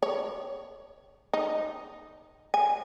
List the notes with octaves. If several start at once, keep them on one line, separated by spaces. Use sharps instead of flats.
C#5
D#4
G#5